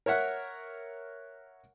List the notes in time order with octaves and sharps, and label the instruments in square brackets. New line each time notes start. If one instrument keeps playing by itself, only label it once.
[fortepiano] A#4 C#5 E5 F#5